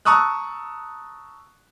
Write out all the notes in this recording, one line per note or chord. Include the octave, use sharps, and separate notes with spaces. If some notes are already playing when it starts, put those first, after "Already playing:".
A5 A#5 C#6 D#6 E6 F#6